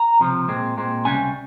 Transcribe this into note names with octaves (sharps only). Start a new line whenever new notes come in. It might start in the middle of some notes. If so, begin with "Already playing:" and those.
Already playing: A#5
C#2 C3 F3
A#2 G#3 C4
A#2 G#3 C4
C#2 C3 G3 C#4 G#5